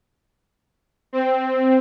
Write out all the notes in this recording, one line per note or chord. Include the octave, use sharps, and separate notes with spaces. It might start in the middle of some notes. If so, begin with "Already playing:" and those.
C4